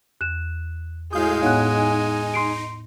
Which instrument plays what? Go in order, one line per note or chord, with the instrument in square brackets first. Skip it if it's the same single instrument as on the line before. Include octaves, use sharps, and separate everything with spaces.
[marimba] E2 [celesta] F#6 E7
[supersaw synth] A2 F5 G6 [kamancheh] G#3 G#5 [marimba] E4 F#4 [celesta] D#6
[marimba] A2 B3 C#5 [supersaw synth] D#4 [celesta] F5 F#5 F#6
[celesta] C6 C7 D7